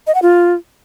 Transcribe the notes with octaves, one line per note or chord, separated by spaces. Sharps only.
D#5
F#5
F4